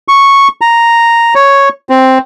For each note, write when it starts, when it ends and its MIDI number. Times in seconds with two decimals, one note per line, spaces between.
0.08 0.48 85
0.61 1.34 82
1.35 1.69 73
1.89 2.18 60